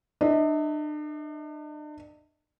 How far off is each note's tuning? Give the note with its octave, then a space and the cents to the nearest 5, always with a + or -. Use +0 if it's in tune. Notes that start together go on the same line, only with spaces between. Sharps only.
D4 +40 D#5 +45